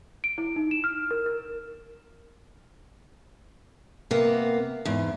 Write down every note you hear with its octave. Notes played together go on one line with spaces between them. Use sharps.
D7
E4
D#4
E7
F6
A#4
A#4
C3 A#3 B3
E2 G#2